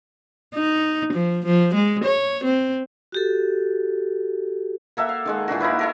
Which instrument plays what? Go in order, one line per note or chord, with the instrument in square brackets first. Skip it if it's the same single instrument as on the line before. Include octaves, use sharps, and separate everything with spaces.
[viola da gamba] D#4
F3
F3
G#3
C#5
C4
[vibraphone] F#4 G4 A4
[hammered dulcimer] A#3 A4 E5 F#5
F5
D#3 G#3 F#5
A#2 E3 D4 F#4
A#3 D#4 E4 B4
E4 A4 A#4